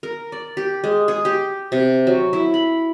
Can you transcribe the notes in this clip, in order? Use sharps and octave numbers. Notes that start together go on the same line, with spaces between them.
A#4
D5
G4
G#3
G#4
G4
C3
F#3
E4
B5